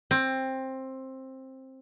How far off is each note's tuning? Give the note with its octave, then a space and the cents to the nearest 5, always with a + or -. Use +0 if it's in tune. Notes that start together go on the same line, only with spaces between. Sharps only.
C4 +15